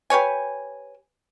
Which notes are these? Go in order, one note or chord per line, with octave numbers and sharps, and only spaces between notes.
G4 B4 C#5 G#5